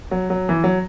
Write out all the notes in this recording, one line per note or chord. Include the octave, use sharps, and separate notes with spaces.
F#3
F#3
E3
F#3